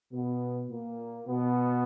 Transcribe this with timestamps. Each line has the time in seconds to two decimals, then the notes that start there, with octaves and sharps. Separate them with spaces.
0.13 B2 B3
0.70 A#2 A#3
1.27 B2 B3